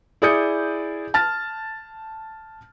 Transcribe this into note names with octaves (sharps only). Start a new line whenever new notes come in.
E4 G#4 D5 D#6 G6 C#7
A5 F6 A6